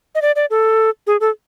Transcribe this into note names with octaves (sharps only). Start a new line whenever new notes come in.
D#5
D5
D5
A4
G#4
A4